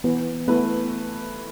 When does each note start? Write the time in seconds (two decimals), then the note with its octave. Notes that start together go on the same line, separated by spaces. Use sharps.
0.04 E3 B3
0.48 A3 B3 E4 B4